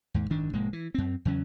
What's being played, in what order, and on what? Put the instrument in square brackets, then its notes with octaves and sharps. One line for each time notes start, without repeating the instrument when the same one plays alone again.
[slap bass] D#2 G#2
G#1 F#2 D#3 D4
F1 A2 G#3 A#3
E3
F#2 C4
E2 C#3 F#3 C#4